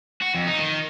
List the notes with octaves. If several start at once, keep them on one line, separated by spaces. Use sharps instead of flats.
F#4
F2
D#4
D#3